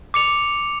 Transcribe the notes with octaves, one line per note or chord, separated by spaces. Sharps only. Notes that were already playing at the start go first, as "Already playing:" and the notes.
D6 C#7 F7